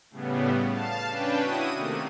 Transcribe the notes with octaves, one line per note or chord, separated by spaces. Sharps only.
A2 C#3 G3 B3
F5 A5
C#4 D4 B4 G5
E4 F#4 D#6 D#7
C3 D#3 A3 A#3